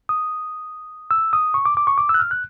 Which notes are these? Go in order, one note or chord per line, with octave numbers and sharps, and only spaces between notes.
D#6
E6
D#6
C#6
D6
D6
C#6
D6
E6
F#6
F6
F#6